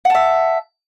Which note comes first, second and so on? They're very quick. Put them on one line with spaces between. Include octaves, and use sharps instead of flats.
F#5 A5 E5